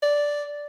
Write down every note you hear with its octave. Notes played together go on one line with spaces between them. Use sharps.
D5